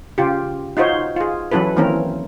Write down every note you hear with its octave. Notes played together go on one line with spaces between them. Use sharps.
C#3 F4 G4
D#4 F4 F#4 C5 C#5
F4 G#4
E3 F#3 C#4 E4 A4 B4
D#3 E3 A#3 C4 C#4 A#4